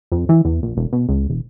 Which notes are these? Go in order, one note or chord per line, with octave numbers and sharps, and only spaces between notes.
F2
E3
E2
A#1
E1
B2
C#2
E1